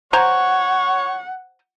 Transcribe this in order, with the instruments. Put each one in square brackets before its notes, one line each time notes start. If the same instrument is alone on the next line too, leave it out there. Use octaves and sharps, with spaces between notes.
[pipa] C5 G#5 A#5 [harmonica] C#5 C#6 [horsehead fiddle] F#5